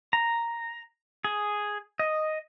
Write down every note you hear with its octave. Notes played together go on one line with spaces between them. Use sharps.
A#5
G#4
D#5